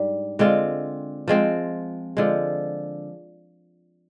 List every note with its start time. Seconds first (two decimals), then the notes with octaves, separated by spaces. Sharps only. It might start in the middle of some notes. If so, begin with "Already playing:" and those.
Already playing: G#2 G3 D4
0.39 D3 G#3 C4 F4
1.28 F3 G#3 C4
2.17 D3 F3 G#3